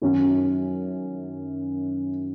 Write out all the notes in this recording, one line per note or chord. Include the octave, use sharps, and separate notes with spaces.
F#2 D#3 F#3 C#4